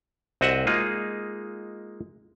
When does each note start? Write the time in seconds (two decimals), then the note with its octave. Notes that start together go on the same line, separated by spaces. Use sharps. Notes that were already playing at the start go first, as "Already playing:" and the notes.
0.41 C2 C4 F#4 D#5 E5 F#5
0.67 G#3 A#3 D#4 F4 G#4